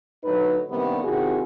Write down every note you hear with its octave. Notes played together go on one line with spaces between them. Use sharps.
D2 A2 F#3 D#4 B4
G2 C3 D#3 G3 A#3 B3
C3 D#3 E4 F#4 G#4